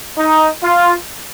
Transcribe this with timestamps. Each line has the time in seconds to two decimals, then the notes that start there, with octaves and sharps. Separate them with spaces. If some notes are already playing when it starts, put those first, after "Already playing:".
0.18 D#4
0.64 F4